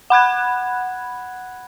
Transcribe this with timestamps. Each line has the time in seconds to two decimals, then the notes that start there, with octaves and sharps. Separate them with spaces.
0.10 F#5 B5 F#6 G#6